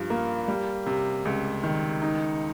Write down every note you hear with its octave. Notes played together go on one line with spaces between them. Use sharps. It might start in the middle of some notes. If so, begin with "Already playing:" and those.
Already playing: G2 F3
A#3
G3
C3
C#2
D#3
D#4